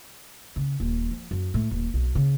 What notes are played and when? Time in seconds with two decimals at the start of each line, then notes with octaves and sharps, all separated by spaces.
0.56 C#3
0.80 D#1
1.11 F3
1.31 F#2
1.54 A2
1.71 D#1
1.94 B1
2.15 C#3